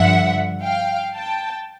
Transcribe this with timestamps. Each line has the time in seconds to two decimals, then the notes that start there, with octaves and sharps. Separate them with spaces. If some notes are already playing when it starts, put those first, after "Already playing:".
Already playing: G2 D3 F3 E5 F#5
0.63 F5 G5
1.15 G5 A5